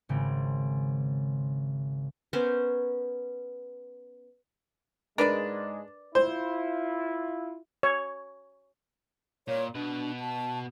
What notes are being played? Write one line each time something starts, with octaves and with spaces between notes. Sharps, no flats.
G#1 C#3 C4
B3 C#4 A#4 C5
G#2 G#3 D4 A#4 B4 D5
E4 F4 C5
C#5
A#2 C#5
B2 D4 B4
A5